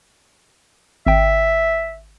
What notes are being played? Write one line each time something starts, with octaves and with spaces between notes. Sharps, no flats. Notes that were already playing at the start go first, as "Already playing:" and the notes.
G#1 E5 G5